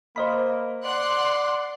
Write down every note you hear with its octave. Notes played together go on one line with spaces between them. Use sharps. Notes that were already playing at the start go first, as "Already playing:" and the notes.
A#3 C5 D#5 B5
D5 F#5 C6 F#6